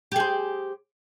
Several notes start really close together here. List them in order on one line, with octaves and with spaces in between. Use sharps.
G4 G#4 C5